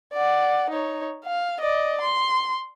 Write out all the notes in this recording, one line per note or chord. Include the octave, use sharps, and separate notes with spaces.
D5 F#5
D#4 C#5
F5
D5 D#5
C6